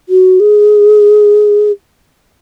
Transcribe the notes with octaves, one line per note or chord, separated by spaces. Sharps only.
F#4
G#4